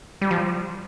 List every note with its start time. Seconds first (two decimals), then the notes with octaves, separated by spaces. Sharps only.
0.22 G3
0.31 F3